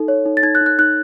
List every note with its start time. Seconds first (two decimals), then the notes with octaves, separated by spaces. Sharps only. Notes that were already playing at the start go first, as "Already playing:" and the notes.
Already playing: D#4 A4
0.08 C#5
0.26 D#4
0.37 A6
0.43 D#4 G#6
0.55 F#6
0.61 D#4
0.66 F#6
0.79 D#4 F#6